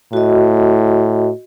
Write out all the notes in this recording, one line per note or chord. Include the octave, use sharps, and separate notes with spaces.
A2 F#4 D#5